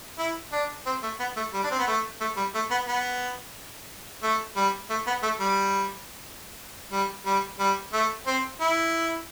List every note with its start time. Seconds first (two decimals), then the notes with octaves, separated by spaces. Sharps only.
0.18 E4
0.52 D4
0.86 C4
1.03 A3
1.19 B3
1.36 A3
1.54 G3
1.63 D4
1.71 C4
1.79 B3
1.87 A3
2.21 A3
2.37 G3
2.54 A3
2.71 B3
2.88 B3
4.23 A3
4.56 G3
4.90 A3
5.07 B3
5.23 A3
5.40 G3
6.92 G3
7.26 G3
7.59 G3
7.93 A3
8.27 C4
8.61 E4